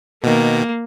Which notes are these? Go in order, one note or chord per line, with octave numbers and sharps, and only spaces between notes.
B2 D#3 A#3